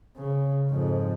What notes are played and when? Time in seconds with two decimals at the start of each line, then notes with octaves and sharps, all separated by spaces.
0.17 C#3
0.69 F2 G#2